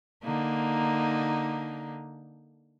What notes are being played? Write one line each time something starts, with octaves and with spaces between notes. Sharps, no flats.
D3 A#3 D#4